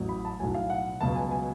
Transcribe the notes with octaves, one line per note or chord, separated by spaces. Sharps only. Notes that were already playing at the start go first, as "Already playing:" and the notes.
Already playing: A1 A2 F#3
B5
A5
B1 A2 F#3 G#5
F5
F#5
C#2 B2 F#3 A5
G#5
G#5